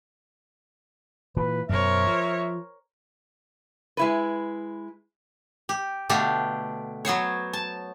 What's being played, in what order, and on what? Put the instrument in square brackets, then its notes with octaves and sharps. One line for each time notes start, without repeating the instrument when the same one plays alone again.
[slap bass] A#2 E3 [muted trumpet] B4
[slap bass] F#2 B2 [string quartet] A#4 C5 C#5 [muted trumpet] E5
[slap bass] F3
[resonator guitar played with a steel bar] G#3 E4 B4
[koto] G4
B2 D3 A3 D4 G4 F5
F#3 B3 C5 C#5
A5